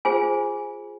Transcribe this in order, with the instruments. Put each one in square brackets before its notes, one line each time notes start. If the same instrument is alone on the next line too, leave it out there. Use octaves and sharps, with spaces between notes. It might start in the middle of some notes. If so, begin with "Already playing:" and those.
[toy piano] F4 G#4 C5 G#5